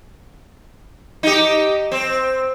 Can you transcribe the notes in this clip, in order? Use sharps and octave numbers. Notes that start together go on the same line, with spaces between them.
D#4 G4
C4